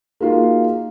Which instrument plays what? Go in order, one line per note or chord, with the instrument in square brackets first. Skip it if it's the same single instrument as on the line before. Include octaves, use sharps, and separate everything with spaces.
[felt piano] A#3 D#4 F4 F#4 G#4